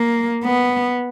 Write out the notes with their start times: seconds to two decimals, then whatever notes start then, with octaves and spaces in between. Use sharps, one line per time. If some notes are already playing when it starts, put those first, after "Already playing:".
Already playing: A#3
0.44 B3